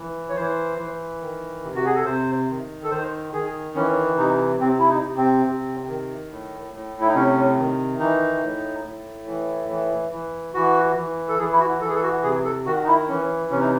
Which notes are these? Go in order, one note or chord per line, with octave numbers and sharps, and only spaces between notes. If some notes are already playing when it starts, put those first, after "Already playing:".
Already playing: E3
C#5
E3 C5
E3
D#3
C3
F#4
G#4
A4
C3 C5
D#3
A4
D#3 C5
D#3 G#4
E3 C#4
C3 D#4
C3 C4
E4
D#4
C3
C4
C3
D#3
A2
A2
E4
D#4
C3 C#4
D#3
E3 D#4
A2
A2
E3
E3
E3
E3 F#4
E3
A4
E3 G#4
E4
F#4
E3 A4
G#4
A4
F#4
C3 G#4
A4
D#3 F#4
D#4
E4
E3 C#4
C3 C#4
D#4